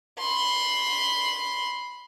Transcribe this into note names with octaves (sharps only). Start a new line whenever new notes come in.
B5 C6